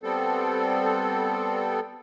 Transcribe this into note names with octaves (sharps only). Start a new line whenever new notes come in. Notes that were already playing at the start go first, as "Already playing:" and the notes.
G3 B3 C4 A4